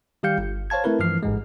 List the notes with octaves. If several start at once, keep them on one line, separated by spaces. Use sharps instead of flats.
D#3 G3 G4 F5 G6 C#7
G1
C5 C#5 F5 A5 G#6
A3 C4 E4 A#4 B4
G2 E3 F3 F6 C7
A1 G#2 G#3